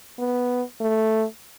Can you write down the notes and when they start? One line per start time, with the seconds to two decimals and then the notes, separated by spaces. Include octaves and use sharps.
0.18 B3
0.81 A3